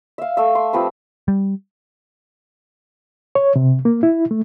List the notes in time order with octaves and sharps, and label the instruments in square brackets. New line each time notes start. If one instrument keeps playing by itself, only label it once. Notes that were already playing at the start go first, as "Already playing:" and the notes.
[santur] E5 F5
A3 E5
C6
F3 C4 G4 B4
[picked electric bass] G3
[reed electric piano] C#5
C3
A#3
E4
A3